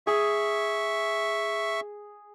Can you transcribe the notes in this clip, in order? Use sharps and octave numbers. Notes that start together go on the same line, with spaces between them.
G#4 E5 C#6